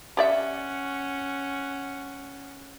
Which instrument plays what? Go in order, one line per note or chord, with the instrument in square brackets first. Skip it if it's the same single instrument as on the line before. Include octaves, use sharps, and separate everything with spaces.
[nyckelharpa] C#4 F#5 [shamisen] G4 D5 E5